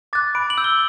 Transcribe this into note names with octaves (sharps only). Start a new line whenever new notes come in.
D6 F#6 A6
B5 D7
F#7
E6 G6
G7